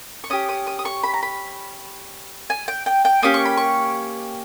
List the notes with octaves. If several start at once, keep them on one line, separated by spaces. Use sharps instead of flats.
C#6
C#4 G4 D#6
D#6
D#6
D#6
C#6
B5
A#5
B5
G#5
G5
G5
G5
A#3 C#4 G4 D#6
C#6
B5
C#6